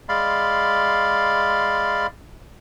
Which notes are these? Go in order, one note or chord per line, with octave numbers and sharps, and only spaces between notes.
G#3 D5 F5 B5 C6